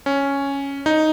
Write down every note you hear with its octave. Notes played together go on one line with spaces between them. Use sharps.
C#4
D#4